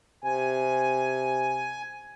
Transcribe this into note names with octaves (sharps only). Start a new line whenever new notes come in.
C3 G#5